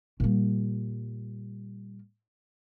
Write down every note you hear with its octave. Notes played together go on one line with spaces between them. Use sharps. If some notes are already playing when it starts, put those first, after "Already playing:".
A#2 G3